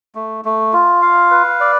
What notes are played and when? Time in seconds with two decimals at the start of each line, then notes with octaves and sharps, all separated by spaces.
0.15 A3
0.45 A3
0.73 F4
1.02 F5
1.31 B4
1.60 D5